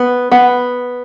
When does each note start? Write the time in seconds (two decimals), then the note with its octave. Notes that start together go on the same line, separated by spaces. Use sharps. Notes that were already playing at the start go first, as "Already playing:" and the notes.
Already playing: B3
0.32 B3 F#5